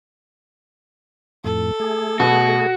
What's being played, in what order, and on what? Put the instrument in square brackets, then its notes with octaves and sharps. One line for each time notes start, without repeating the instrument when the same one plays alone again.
[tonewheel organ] F2 A2 [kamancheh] A4
[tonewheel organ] A3 G#4
[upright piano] B2 [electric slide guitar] F#4